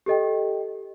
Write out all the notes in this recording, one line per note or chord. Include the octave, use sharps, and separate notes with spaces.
G4 A4 D#5 G5